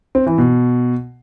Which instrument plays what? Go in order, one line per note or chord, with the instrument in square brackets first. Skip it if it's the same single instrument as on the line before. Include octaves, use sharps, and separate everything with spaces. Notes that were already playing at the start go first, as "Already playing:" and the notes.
[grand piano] C4
E3
B2